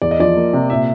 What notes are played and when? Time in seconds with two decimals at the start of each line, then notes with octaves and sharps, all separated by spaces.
0.02 E2 D5
0.11 D#5
0.19 F3 D5
0.36 A#3
0.53 C3
0.70 A#2 E5